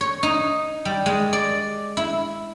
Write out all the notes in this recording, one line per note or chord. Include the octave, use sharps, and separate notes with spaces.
C#5
D#4
G3
G#3
D5
E4